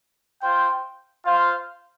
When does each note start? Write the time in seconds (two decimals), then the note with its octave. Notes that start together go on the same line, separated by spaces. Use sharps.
0.41 F4 C5 G5
1.25 F4 C5 F5